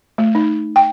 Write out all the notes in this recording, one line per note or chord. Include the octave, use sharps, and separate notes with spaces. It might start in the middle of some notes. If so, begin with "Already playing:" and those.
A3
D#4
G5